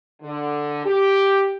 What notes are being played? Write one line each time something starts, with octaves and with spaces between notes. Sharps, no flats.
D3
G4